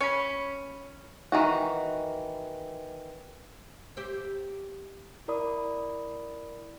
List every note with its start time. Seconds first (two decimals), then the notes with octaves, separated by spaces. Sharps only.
0.01 C#4 C#5 B5
1.32 D#3 E3 F#4
3.97 G4 C5 E5
5.28 E4 A#4 D5 B5 D#6